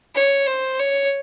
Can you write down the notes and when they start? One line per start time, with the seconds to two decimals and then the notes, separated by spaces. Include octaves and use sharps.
0.15 C#5
0.47 C5
0.79 C#5